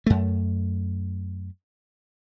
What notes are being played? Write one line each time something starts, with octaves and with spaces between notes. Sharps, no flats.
F#2 A3